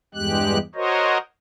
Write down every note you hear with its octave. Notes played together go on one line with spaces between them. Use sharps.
E2 G2 G#3 G4 F#6
F#4 A#4 C5 C#5 D#5